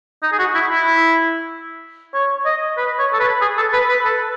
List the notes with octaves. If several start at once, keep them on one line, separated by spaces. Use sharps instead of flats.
D#4
G#4
F#4
E4
E4
C#5
D#5
B4
C#5
A4
B4
G#4
A4
B4
B4
A4